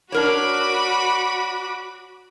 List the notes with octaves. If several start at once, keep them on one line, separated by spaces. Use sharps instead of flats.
D4 F#4 A#4 C#5 B5 D6